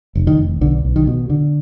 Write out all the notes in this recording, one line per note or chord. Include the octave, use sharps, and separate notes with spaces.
F1
D#3
F1
B1 D3
B1
D#3
B2
D3